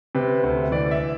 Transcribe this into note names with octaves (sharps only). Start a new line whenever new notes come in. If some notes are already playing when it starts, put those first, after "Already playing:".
C3 B4
D2
E5
E3 D5
E5